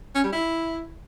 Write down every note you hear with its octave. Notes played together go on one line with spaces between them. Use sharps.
C#4
G3
E4